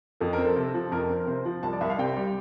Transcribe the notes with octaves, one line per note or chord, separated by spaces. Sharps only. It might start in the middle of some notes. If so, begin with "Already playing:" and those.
F2 A4
C4 A#4
A4
C3
F3
F2 A#4
C4
A#4
C3 C5
F3
C2 A5
D5
C2 E5
F5
C3 G5
G3